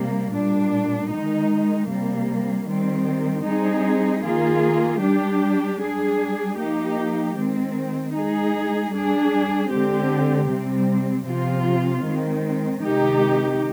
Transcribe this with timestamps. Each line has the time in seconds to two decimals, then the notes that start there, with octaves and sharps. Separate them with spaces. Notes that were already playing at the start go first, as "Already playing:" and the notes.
Already playing: C3 G3 A#3
0.33 A#2 G3 D4
1.11 D#3 G#3 D#4
1.90 C3 G3 A#3
2.67 D#3 G3 C4
3.46 G3 C4 D#4 G#4
4.24 D#3 A#3 F4 G#4
5.02 G3 D4 G4
5.80 G3 D4 G#4
6.58 F3 A#3 D#4 G4
7.36 D#3 G#3 C4
8.15 G#3 D#4 G#4
8.92 G3 D4 G#4
9.71 D3 G#3 C4 G4
10.49 C3 G3 C4
11.27 C3 F3 C4 F4
12.05 D#3 G#3 C4
12.83 C3 D#3 G#3 D#4 G4